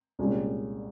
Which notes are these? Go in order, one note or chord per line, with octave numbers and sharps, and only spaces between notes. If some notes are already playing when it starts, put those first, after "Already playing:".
C2 A#2 G#3 C#4 G4